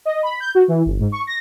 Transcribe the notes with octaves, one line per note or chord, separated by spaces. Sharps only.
D#5
B5
G6
F#4
E3
G1
G#2
C#6
A#6